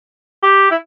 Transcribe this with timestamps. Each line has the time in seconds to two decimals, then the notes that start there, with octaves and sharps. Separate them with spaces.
0.43 G4
0.71 E4